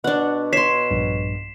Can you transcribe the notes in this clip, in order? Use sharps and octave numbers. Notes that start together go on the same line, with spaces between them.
B2 D4 F#5
C#5 C6 B6 C7 E7
A#1 G2